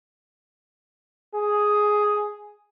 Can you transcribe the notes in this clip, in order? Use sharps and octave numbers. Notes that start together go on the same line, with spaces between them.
G#4